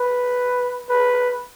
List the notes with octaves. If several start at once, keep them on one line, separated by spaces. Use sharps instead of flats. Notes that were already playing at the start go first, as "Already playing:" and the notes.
Already playing: B4
B4